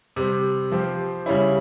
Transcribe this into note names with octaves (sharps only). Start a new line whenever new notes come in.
C3 G3 C4
F3 C4 G4
C#3 G3 C#4 E4